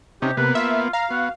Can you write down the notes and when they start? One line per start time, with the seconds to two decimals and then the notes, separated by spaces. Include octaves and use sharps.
0.22 C3 C#4 D#4 G4
0.37 C3 A#3 B3 B4
0.55 F4 E5
0.93 F5 A#5
1.10 B3 F#4